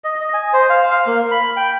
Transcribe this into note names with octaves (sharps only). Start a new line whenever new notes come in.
D#5
D#5
G#5
C5
F5
F5
A#3
B5
G5